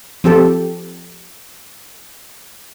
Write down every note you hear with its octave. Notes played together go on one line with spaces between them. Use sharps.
F3 C4 G4 A4